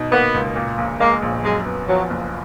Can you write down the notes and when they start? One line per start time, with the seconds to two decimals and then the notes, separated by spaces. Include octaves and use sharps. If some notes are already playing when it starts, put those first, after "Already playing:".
Already playing: B2 D#4
0.12 A#3 B3
0.34 C#2
0.56 A#2
0.78 A#1
1.00 G#3 A#3
1.22 A#1
1.43 F#2 G#3
1.66 B3
1.88 F3 F#3
2.10 F#1